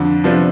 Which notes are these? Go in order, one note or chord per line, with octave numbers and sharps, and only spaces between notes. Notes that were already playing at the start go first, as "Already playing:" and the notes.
Already playing: F2 D3 D4
C3 F3 B3 D4